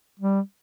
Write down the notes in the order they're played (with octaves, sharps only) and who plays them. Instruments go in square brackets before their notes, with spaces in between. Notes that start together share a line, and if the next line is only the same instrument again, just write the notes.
[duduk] G3